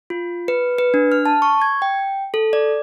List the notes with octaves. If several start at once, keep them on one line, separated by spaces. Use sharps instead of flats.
F4
B4
B4
D4
F6
A5
C#6
G#6
G5
A4
D5